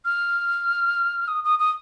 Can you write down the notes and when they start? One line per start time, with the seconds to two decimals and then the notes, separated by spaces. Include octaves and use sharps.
0.05 F6
1.28 D#6
1.44 D#6
1.59 D#6